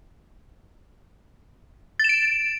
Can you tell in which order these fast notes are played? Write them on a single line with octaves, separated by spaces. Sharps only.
A6 E7 D7